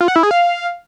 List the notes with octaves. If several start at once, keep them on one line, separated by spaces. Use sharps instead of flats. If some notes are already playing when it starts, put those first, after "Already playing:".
F4
F#5
E4
G#4
F5